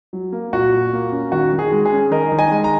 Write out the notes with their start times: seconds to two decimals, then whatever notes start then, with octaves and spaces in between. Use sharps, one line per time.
0.13 F#3
0.32 A#3
0.53 A#2 F#4
0.73 A#2
0.93 A#3
1.12 C#4
1.32 D#3 F#4
1.53 D#3
1.59 G#4
1.72 G#3
1.85 G#4
1.92 C#4
2.11 D#3 A#4 D#5
2.32 D#3
2.39 D#5 G#5
2.51 G#3
2.64 A#5